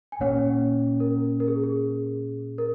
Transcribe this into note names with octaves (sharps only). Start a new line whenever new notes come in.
G#5
A#2 A#3 C#4 C#5 F#5
A#4
A#4
G#4
G#4
A#4